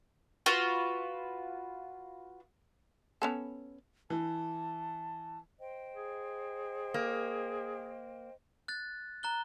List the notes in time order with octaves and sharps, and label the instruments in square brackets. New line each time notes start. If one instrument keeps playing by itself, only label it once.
[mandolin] F4 F#4 B4
[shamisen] B3 C#4 A4
[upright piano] E3 [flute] A5
[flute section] C5 D#5 G5
[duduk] G#4
[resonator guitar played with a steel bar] A#3
[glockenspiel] F#6 A6
A#5 F#6 G7